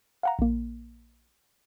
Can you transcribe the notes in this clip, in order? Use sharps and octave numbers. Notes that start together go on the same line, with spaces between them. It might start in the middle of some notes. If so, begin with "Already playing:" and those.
F5 F#5 A#5
A#1 A#3